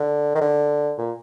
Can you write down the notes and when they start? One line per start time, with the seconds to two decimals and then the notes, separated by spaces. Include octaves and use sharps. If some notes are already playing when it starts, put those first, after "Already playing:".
Already playing: D3
0.35 D#3
0.41 D3
0.99 A#2